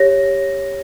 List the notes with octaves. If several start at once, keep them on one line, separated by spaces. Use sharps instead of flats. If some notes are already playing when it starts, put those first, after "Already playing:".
Already playing: G4 C#5 A#6